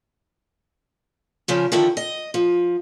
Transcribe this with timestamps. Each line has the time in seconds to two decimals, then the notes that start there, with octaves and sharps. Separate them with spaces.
1.48 C#3 F3 C#4
1.72 D3 D#3 F3 E4
1.97 D#5
2.34 F3